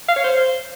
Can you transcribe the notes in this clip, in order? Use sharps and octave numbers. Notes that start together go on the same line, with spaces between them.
F5
C#5
C5